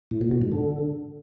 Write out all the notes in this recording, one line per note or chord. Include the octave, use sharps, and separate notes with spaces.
A2
A#2
B2
G#2
D3